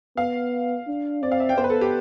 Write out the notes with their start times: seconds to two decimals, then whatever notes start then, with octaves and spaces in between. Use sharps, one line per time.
0.17 B3 F5
0.87 D4
1.22 C4 D5
1.32 F5
1.40 E5
1.49 G5
1.57 B3 C5
1.64 B4
1.70 A4
1.81 G4